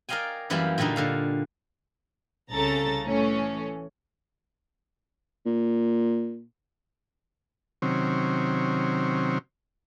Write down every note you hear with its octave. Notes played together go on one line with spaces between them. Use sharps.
A#4 D5 D#5 F5 G5 G#5
F#2 E3 G3 A#3 G4 F5
A#2 D3 G3 A#3 D#4
A#2 D3 F5
C2 C#3 A4 A#5 A6
A2 E3 A3 C#4
A#2
C3 D#3 F#3 C4 C#4